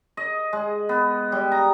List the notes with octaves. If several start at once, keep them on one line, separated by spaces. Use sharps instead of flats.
D#5
G#3
B3
G3
A#5